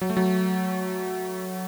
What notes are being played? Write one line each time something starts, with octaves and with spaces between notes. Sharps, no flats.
F#3
A3
F#3